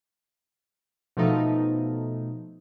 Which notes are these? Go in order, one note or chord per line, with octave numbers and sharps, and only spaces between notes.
B2 F3 A3 D#4